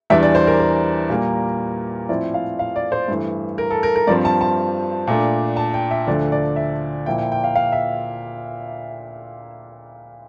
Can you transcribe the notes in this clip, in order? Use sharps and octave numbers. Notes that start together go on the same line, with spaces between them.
E2 E3 G3 D4 E5
D5
C5
A#4
A#4
A#2 G3 A#3
A2 F3 C4 E4 D5
F5
F5
D5
C5
G2 E3 A3
A#4
A4
A#4
A#4
G2 F3 C4 D5
A5
A5
A#2 A3 D4
A5
G5
E5
D2 D3 F3 A3 D5
D5
E5
A#2 F3 A#3 E4 G5
G5
G5
F5
F5
E5